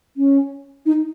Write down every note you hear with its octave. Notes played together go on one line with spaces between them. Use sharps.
C#4
D#4